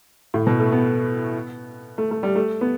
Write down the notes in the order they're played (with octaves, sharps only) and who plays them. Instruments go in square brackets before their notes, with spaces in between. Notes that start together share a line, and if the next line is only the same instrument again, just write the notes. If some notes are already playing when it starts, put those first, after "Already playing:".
[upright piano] A2
B2
A3
B3
A3
A3
G3
A3
B3